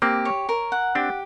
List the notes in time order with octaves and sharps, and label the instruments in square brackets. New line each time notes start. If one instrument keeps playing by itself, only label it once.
[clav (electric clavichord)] A#3 C4 [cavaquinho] G4
[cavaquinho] C#5
A#4
F#5
[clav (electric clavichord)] C4 D4 [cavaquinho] G4